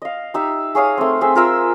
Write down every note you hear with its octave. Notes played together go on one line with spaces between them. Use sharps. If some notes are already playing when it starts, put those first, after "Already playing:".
D#5 F5
D#4 G4 E5
G#4 C#5 F5 D#6
A3 C4
C4 G#4 E5
F4 A#4 E5 E6